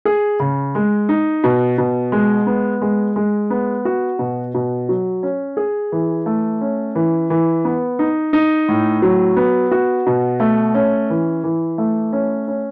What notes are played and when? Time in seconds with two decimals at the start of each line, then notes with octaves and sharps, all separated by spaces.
0.05 G#4
0.40 C#3
0.75 G#3
1.09 D#4
1.44 B2
1.78 B2
2.12 G#3
2.46 B3
2.82 G#3
3.16 G#3
3.50 B3
3.85 F#4
4.19 B2
4.54 B2
4.89 F#3
5.23 C#4
5.57 G#4
5.92 E3
6.26 A3
6.61 C#4
6.95 E3
7.30 E3
7.65 B3
7.99 D#4
8.33 D#4
8.68 A2
9.02 F#3
9.36 B3
9.71 F#4
10.07 B2
10.40 A3
10.75 C#4
11.10 E3
11.44 E3
11.78 A3
12.13 C#4
12.48 C#4